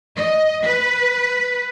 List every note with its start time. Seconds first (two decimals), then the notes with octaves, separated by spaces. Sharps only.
0.18 D#5
0.66 B4